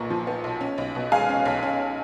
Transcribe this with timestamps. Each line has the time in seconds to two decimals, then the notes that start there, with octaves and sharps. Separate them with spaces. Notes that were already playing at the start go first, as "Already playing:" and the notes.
Already playing: B1 A#2 B3 A#5 C#6
0.10 F3
0.27 B3
0.44 B1
0.61 C#4
0.78 B1
0.95 B2
1.12 G#3 F5 G#5
1.29 C#4
1.45 B1
1.63 C#4